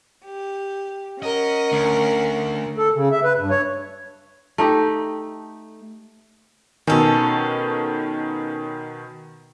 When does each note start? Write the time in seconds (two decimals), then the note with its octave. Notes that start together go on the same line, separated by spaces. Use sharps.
0.25 G4
1.22 C#4 A#4 D#5 F#5
1.72 D2
2.78 A4
2.94 C#3
3.11 E5
3.24 B4
3.37 G2
3.51 C#5
4.58 A3 D#4 G4
6.87 B2 D#3 C#4 A4